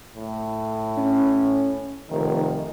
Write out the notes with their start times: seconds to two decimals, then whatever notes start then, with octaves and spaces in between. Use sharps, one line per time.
0.14 A2
0.97 C#4
2.10 F1 D#3